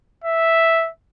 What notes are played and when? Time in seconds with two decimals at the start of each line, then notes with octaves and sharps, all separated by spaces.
0.24 E5